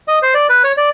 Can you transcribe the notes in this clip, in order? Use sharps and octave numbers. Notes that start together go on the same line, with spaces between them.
D#5
C5
D5
B4
C#5
D5